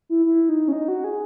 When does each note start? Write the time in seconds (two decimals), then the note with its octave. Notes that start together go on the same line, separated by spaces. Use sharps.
0.09 E4
0.25 E4
0.49 D#4
0.68 C#4
0.73 D#4
0.88 F#4
1.04 G#4